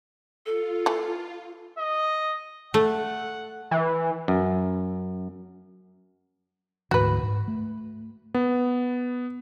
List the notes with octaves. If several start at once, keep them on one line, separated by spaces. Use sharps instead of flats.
F4 A4
E3 A3
D#5
A3 F#5
E3
F#2
D2 G#2 E3 F#4 B4
G#2
A3
B3